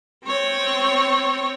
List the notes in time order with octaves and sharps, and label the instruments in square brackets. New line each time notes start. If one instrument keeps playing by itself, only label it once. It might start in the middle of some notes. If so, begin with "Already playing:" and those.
[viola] C4 C#5